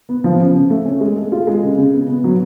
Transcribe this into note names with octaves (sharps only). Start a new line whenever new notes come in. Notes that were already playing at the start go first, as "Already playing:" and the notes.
B3
F3
C#3
C#3
A3
C#4
G#3
A4
F4
G#3
C#3
C#3
B3
B3
F#3